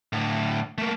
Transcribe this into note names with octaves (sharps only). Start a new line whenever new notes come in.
A2 D3
A3 A#3